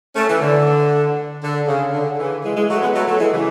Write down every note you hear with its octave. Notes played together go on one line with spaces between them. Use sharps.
A3 C#4
E3
D3
D3
C#3
D3
C#3 E3
E3 G#3
E3 G#3
F#3 A3
G#3 B3
F#3 A3
F#3 A3
E3 G#3
C#3 E3